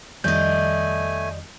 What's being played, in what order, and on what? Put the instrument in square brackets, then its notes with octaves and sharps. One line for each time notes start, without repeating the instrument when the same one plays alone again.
[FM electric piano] F2 D#3 G3 [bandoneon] A3 G#5 [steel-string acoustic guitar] D5 D#5 [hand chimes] G6